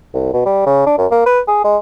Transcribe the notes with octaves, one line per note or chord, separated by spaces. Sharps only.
C2
B2
G3
C#3
D4
F#2
A#3
B4
G#4
G#3